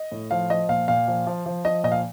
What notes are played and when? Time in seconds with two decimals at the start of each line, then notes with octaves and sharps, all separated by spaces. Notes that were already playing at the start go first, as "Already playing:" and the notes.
Already playing: D#5
0.12 A2
0.31 F3 F5
0.50 F3 D#5
0.69 A#2 F5
0.88 A#2 F5
1.08 F3
1.27 F3
1.46 F3
1.65 F3 D#5
1.84 A#2 D#5
1.92 F5